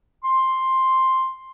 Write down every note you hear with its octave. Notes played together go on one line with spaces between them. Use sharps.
C6